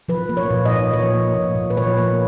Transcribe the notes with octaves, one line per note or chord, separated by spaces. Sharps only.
F3 B4
A#3
C#5
A#2
D#5
A#2
F3 C#5
A#3
A#2
A#2
B4
F3 C#5
A#3 B4